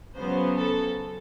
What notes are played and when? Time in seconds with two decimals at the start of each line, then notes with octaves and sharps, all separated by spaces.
0.16 C#3 F#3 B3 C5
0.57 A4